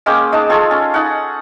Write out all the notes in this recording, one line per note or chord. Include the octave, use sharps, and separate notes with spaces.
G#3 A#3 C#4 G5
G#3 D#4 A5 D6
F4 G#4 A4 C#5
C#4
D#4 F#5